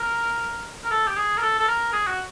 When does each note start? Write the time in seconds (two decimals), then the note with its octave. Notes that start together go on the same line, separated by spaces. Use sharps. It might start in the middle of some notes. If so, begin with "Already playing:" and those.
Already playing: A#4
0.84 A#4
0.91 A4
1.07 G4
1.17 G#4
1.38 A#4
1.42 A4
1.59 A4
1.68 A#4
1.93 G#4
2.07 F#4